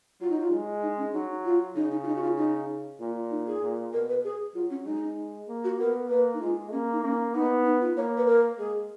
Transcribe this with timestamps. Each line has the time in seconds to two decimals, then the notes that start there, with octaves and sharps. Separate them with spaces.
0.21 F#3 F4
0.30 D#4
0.41 F4
0.52 G#3
0.83 D#4
0.98 C#4
1.13 F#3 D#4
1.45 F4
1.76 C#3 D#4
1.91 D#4
2.03 F4
2.07 D#4
2.16 F#4
2.23 F4
2.37 D#4
2.99 A#2 F4
3.31 D#4
3.47 G#4
3.62 A#2
3.93 B2 A#4
4.09 B4
4.24 G#4
4.55 F#3 F4
4.70 C#4
4.86 G#3 D#4
5.48 A#3
5.64 F#4
5.79 B3 A#4
6.10 A#3 B4
6.34 D#4
6.41 G#3 F4
6.72 A#3 C#4
6.93 D#4
7.03 A#3 C#4
7.34 B3 D#4
7.65 D#4
7.81 F4
7.96 A#3 C#5
8.17 B4
8.27 A#4
8.58 G#3 G#4